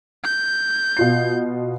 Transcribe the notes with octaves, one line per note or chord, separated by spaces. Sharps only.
G6
B2 F4 C7